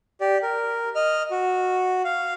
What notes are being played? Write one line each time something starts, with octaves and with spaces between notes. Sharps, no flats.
G4 D5
A#4
D#5 F6
F#4
F5